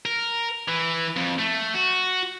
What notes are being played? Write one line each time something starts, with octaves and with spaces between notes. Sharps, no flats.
A#4
E3
F2
A3
F#4